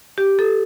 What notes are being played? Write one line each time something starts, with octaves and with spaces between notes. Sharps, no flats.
G4
A4